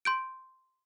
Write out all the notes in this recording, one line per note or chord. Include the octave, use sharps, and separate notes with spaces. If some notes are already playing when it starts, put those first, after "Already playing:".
C6 G6 D7